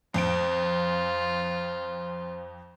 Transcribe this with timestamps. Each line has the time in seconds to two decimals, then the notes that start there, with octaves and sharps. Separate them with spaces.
0.14 F2 F4 C5 D7